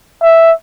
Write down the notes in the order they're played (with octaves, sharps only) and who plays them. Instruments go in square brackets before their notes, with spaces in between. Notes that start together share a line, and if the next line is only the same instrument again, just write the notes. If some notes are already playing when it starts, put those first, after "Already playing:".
[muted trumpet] E5